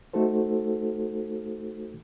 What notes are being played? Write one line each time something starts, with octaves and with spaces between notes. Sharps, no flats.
A3 D#4 F#4 A4 C5